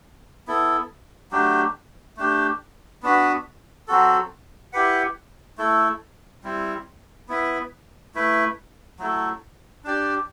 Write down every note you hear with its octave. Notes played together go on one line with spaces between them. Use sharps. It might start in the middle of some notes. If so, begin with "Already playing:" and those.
B3 E4 A4
F#3 A3 D4 G4
A3 D4 G4
B3 D4 F#4 B4
F#3 C4 F#4 A4
E4 G4 B4 F#5
A3 E4 A4
G3 C4 E4
B3 E4 B4
A3 E4 B4
F#3 A3 E4 A4
D4 G4 D5